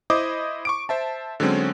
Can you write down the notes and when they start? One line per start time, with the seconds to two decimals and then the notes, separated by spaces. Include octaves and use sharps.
0.10 E4 C5 D#5 D6 D#6
0.65 C#6 D6 D7
0.89 C5 E5 A5
1.40 D3 F#3 G#3 C4 C#4